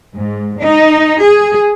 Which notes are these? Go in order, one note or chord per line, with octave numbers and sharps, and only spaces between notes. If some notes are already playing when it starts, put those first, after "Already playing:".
G#2
D#4
G#4